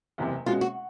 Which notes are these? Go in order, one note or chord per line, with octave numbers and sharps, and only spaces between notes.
F#1 E2 C3
B2 G#3 C#4 F4 F#4
F#4